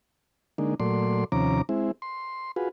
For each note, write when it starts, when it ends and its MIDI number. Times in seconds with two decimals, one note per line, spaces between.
0.58 0.75 50
0.58 0.75 56
0.58 0.75 58
0.58 0.75 62
0.58 0.75 63
0.80 1.24 46
0.80 1.24 54
0.80 1.24 57
0.80 1.24 74
0.80 1.24 84
1.32 1.62 39
1.32 1.62 48
1.32 1.62 53
1.32 1.62 61
1.32 1.62 82
1.32 1.62 86
1.69 1.91 56
1.69 1.91 60
1.69 1.91 64
2.02 2.52 84
2.56 2.69 65
2.56 2.69 66
2.56 2.69 68
2.56 2.69 71